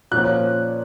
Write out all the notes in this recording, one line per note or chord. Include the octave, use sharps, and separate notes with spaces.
A#2 F3 A#3 C#4 F#6